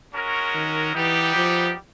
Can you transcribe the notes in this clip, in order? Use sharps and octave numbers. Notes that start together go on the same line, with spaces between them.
G#3 C#4 F#4 A#4
D#3
E3 G3 B3 D#4 G4
F3